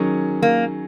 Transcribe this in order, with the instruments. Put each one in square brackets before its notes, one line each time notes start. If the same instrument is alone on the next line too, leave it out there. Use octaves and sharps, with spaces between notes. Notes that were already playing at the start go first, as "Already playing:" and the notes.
Already playing: [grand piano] D#3 F#3 C#4 G#4
[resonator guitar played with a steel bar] A#3